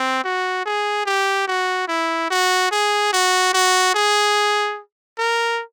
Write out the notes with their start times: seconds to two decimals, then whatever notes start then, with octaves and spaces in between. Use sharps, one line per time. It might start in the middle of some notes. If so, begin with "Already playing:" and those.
Already playing: C4
0.24 F#4
0.66 G#4
1.06 G4
1.48 F#4
1.88 E4
2.30 F#4
2.71 G#4
3.13 F#4
3.54 F#4
3.94 G#4
5.18 A#4